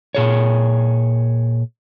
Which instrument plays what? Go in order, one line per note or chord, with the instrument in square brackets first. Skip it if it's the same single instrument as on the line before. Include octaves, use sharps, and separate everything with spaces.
[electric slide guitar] A#2 G#4 C#5